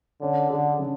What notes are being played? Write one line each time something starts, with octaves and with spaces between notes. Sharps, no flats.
D3 C#4
D3 G#4
C#3